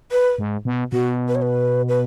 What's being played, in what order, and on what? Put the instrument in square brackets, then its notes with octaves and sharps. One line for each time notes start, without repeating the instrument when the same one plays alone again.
[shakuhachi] B4
[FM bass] G#2
B2
[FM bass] B2 [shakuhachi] F#4
[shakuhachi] B4
C#5
B4
B4